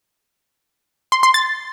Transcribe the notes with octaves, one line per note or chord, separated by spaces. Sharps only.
C6
C6
A6